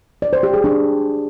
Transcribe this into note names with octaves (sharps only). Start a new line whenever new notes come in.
D5
C5
G4
G#4
D4